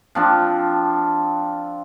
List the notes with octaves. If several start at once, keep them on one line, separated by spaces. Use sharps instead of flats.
F3 C4 D4